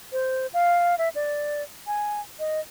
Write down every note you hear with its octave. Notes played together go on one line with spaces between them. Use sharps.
C5
F5
E5
D5
G#5
D#5